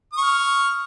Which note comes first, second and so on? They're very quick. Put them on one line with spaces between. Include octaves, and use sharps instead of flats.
D#6 C#6 F6